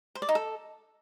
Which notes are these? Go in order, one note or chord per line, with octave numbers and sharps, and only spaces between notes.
C5
D5
D#4
A4